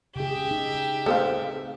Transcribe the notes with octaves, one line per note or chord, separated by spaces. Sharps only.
C#3 G4 G#4 E5
D#4
A3 C4 A4 C5 F5